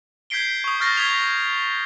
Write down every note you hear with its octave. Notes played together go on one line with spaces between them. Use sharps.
G6 G#6 B6 C7 D7 G7
C#6 D#6
C#6 F6 G6 A6 A#6 C7
D#6 G#6 B6 F7 G7